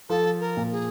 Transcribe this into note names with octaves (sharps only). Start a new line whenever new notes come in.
F3 A4
A#4
A#2
G#4